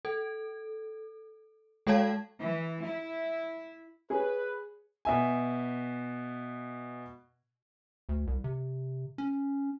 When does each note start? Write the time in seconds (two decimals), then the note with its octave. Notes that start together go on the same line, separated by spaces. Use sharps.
0.05 A4
1.87 G#3 A4 C#5 F5 A5 G#6
2.39 E3
2.84 E4
4.10 G#4 B4 C#5 G#5
5.05 B2 E5 G#5
8.09 D2
8.27 C2
8.44 C3
9.18 C#4